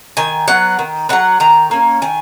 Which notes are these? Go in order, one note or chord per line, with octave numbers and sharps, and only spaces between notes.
D#3 G#5
F#3 B3 F#5
D#3
F#3 B3 F#5
D#3 A#5
A#3 C#4
D#3 G#5